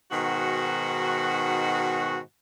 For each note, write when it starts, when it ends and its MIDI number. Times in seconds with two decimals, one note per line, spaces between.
0.11 2.20 44
0.11 2.20 47
0.11 2.20 51
0.11 2.20 66